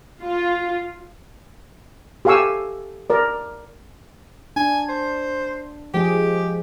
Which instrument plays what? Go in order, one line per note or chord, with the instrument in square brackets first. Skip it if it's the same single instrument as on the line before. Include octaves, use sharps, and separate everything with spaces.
[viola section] F4
[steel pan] G4 A4 F5 G#5 C#6 E6
A#4 D5
[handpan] D4 [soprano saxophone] G#5
[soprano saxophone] C5
[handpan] F3 G#3 G#4 [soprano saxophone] G4